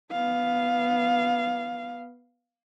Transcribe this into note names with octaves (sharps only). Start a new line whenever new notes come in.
B3 F5